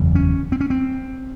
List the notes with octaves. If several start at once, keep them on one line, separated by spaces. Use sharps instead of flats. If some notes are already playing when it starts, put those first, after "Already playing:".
Already playing: F#1 E2 C#3
C#4
C4
C#4
C4